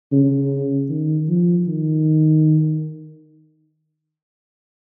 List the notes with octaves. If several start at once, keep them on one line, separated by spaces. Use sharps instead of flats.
C#3
D#3
F3
D#3